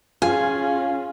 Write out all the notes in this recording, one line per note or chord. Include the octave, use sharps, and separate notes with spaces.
C#4 F4 G#4 G#5